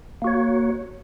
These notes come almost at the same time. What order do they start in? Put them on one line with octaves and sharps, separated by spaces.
A#3 F#4 C#5